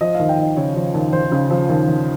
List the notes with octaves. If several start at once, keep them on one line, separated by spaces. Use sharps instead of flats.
F3 D#5
D#2 F5
G5
D#2 D#5
C#3 C#5
F3
D#2
D#2 C5
C#3
F3
D#2
D#2